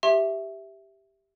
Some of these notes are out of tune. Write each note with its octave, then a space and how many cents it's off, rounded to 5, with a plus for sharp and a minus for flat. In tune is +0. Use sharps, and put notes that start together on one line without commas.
G4 +0 E5 +0 C6 +35